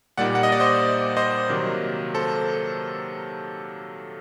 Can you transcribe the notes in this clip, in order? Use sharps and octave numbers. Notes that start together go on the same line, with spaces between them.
A#2 G3 A#3 D#4 D5 F#5
F#5
D#5
D5
C5 D#5
C5 D#5
C3 D#3 F#3 A#3
A4 C5